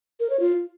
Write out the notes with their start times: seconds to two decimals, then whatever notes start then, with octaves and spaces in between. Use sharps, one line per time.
0.20 A#4
0.30 C#5
0.40 F4